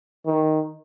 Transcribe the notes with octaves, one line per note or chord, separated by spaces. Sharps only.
D#3